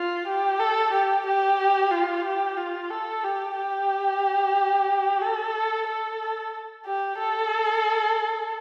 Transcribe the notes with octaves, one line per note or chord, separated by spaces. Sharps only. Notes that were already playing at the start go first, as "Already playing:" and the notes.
Already playing: F4
G4
A4
G4
G4
F4
G4
F4
A4
G4
G4
A4
A4
G4
A4